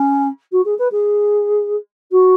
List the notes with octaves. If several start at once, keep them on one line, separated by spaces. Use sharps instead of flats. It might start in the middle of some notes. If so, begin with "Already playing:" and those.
Already playing: C#4
F#4
G#4
B4
G#4
F#4